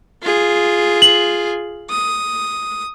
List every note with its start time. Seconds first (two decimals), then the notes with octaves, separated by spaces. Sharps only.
0.23 F4 G#4
1.02 F#7
1.90 D#6